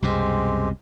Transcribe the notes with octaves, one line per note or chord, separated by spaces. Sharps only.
C2 F#2 B2 G#3 C4 G4